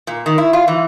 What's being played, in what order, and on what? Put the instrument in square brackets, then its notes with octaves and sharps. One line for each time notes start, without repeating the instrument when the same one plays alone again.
[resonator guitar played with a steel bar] A#2
D#3
E4
F4
E3